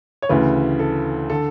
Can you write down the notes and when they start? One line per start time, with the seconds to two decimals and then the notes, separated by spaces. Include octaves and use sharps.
0.22 C#5
0.29 D2 C#3 E3 B4
0.79 A4
1.30 D3 A4